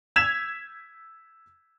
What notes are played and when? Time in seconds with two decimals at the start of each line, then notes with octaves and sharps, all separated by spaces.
0.16 E6 G#6 B6 E7 F7